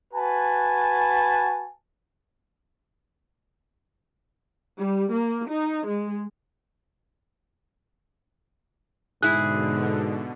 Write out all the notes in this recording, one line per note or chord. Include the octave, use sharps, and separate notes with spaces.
F#4 B4 G#5 A5
G3
A#3
D#4
G#3
G#2 B2 D3 E4 G#4 F#6